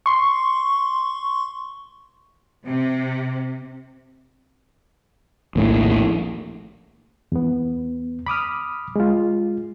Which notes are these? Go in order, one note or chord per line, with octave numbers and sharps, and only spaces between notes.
C6 C#6
C3
A#1 D#2 A2
E2 B3
B5 D6 D#6 F6
G#3 F4